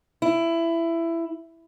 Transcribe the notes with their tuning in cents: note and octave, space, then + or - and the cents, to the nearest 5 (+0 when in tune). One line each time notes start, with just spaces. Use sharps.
E4 +15